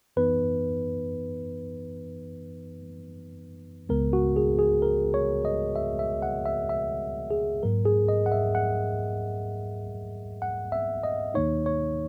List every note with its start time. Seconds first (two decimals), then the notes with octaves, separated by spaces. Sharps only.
0.16 F#2 E3 B3 D#4 B4
3.89 C#2 C#3 G#3 B3 A#4
4.13 F#4
4.36 G#4
4.59 G#4
4.82 A#4
5.14 C#5
5.45 D#5
5.76 E5
5.99 E5
6.22 F#5
6.46 E5
6.69 E5
7.31 G#4
7.62 G#2 F#3 A#3 A#4
7.85 G#4
8.09 D#5
8.26 F#5
8.32 E5
8.55 F#5
10.42 F#5
10.72 E5
11.04 D#5
11.34 D#2 D#3 A#3 D#4 C#5
11.66 C#5